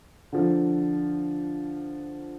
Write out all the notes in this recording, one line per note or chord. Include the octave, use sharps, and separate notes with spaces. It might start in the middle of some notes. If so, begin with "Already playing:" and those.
D3 F3